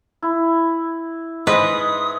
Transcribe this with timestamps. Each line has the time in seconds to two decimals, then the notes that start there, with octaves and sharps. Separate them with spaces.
0.22 E4
1.47 G#2 B4 D#5 B5 D#6